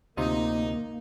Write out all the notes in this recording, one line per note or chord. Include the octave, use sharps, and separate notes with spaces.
D2 C3 A#3 D#4 F4